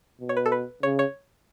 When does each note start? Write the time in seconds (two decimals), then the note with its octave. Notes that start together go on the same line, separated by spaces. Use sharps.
0.20 B2
0.29 C#5
0.37 B4
0.46 A4
0.52 B4
0.83 C#3 C#5
0.99 C#5